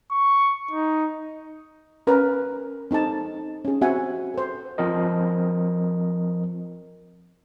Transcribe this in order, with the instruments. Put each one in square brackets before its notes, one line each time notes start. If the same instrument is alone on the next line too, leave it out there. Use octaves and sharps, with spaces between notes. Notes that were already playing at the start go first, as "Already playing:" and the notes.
[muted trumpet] C#6
D#4
[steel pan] C#4 A#4 B4
C4 D#4 A4 A5
C#4 G#4
C4 F#4 E5 F#5 G#5
A4 C5
[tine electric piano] F3 C4 A#4 D#5